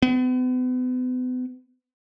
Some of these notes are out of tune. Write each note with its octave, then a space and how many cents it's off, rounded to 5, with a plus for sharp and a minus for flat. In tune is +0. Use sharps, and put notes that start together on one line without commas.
B3 +40